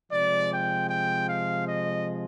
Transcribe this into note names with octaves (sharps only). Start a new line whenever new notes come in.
C3 F3 G#3 D5
G5
G5
F5
D#5